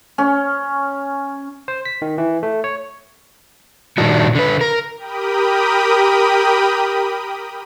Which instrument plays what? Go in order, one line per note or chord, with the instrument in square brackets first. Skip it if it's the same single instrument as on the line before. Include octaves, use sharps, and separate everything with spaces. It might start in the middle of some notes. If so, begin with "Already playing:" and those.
[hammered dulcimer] C#4
[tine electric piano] C5
B6
D#3
E3
A3
C#5
[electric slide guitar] A#2 D#3 G3 D4 F#4
D3 B4
A#4
[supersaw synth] G4 A#4 G5 B5 D#6